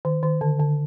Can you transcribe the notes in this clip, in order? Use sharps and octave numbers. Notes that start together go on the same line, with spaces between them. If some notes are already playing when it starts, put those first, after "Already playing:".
D#3
D#3
D3
D3